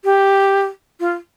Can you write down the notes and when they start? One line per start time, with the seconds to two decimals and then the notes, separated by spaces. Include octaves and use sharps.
0.05 G4
1.00 F4